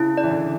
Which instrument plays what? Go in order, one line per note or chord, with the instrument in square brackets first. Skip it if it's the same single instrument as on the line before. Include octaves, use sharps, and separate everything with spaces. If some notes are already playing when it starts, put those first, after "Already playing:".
Already playing: [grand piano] C#3 [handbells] E4
[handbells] D5
[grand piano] E3
D3